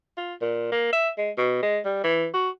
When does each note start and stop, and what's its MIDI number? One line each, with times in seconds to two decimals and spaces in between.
0.17 0.34 65
0.41 0.70 46
0.72 0.93 58
0.93 1.09 76
1.17 1.30 56
1.38 1.58 47
1.63 1.79 56
1.85 2.00 55
2.04 2.26 52
2.34 2.49 66